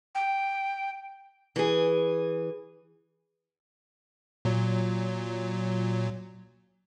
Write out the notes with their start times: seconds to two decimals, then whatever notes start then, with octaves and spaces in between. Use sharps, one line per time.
0.15 G5
1.56 E3 G#4
4.45 A#2 F#3